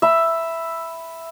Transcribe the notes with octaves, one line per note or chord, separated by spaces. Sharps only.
E5 B5